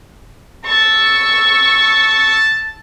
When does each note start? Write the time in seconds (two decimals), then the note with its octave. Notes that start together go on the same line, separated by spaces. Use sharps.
0.65 A5 C#6 E6